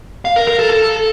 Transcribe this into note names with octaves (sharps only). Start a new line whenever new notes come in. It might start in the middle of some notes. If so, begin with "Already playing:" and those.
F5
A#4
A#4
A4
A4